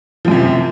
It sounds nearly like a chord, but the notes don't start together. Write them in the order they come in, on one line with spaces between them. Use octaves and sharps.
F3 F#2 C3